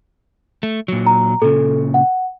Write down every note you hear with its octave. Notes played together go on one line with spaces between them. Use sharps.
A3
A#2 F#3
A#5
A#2 C#3 A4
F#5